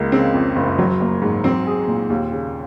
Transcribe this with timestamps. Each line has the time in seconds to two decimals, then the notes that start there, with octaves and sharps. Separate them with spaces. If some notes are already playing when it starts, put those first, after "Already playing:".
Already playing: C#2 A#3
0.12 C#3 C4
0.34 F2
0.56 F#1
0.79 F#3
1.01 A#3
1.22 G#2
1.44 F#3 C4
1.67 G#4
1.87 A#2
2.10 D#2
2.32 C#3